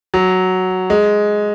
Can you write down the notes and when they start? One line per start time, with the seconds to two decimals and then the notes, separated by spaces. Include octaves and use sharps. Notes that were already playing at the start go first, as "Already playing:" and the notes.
0.14 F#3
0.90 G#3